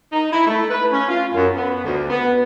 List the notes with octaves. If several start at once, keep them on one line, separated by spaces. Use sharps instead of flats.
D#4
E4
A3
B4
C#4
F4
F#2
B3
D2
B3